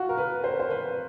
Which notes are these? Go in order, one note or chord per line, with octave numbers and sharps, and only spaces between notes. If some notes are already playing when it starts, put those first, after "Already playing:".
Already playing: F4 F#4
A#4
B4
C5
C5
B4